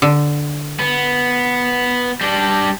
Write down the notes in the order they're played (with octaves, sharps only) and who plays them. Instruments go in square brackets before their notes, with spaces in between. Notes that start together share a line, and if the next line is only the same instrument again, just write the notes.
[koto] D3
[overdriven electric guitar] B3
G3 D4